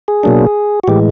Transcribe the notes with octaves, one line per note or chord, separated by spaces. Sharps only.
G#4
B2 F#3 A#3 D4
F#4
A2 E3 G#3 G4